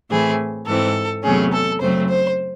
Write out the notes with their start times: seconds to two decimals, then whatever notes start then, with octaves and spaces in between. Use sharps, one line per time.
0.10 A2 E3 A3 C4 G#4
0.67 G#2 E3 C4 A4
1.24 E2 C3 F#3 A3 C#4 G#4
1.52 A4
1.80 F#2 C#3 F#3 A3 C4 C5
2.09 C5